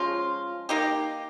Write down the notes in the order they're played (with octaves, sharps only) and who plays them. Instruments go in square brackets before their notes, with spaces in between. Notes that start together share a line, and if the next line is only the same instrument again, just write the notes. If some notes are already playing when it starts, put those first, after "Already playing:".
Already playing: [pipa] F3 G#3 C#4 F4
A#3 D#4 G4